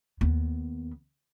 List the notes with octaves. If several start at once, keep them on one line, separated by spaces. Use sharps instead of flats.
D#2 B3